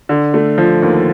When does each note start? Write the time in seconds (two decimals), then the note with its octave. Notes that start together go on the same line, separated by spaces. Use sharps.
0.09 D3
0.34 A3
0.58 F3
0.82 D#2